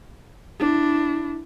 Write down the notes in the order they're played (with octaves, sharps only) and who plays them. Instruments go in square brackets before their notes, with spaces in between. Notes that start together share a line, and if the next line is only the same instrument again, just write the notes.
[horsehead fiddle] D4 E4